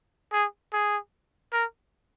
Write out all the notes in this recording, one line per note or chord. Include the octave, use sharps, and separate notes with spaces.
G#4
G#4
A#4